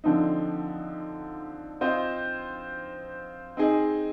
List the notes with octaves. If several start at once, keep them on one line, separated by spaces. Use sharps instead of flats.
D3 F3 C4 D#4
C4 F4 C5 D#5
C4 D#4 G#4 D#5